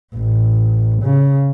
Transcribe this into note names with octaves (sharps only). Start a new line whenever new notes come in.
A1
C#3